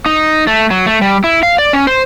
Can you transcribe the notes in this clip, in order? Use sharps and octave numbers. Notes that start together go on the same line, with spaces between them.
D#4
A3
F#3
A3
G3
E4
F5
D5
C#4
C5